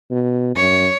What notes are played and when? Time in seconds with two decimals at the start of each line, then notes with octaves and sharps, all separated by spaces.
0.11 B2
0.56 F#2 C#5